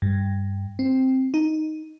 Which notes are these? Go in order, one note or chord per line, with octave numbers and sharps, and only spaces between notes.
G2
C4
D#4